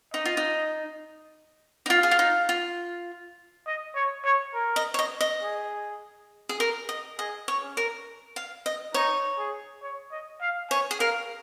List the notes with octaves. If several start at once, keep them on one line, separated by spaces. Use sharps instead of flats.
D#4 D#5
F4
D#4
D#4
F4 F5
G#4
F4
D#4
F4
D#5
C#5
C#5
A#4
D#5
C#5
D#5
D#5
G#4
G#4
A#4
D#5
G#4 D#5
C#5
C#4
A#4
F5
D#5
D#4 C#5
G#4
C#5
D#5
F5
C#5 G#5
G#4
A#4 F5